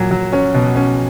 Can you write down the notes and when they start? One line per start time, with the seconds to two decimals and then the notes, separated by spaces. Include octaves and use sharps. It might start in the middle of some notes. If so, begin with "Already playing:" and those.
Already playing: A#2 F#3
0.11 F#3
0.33 C#4
0.54 B2
0.76 C#4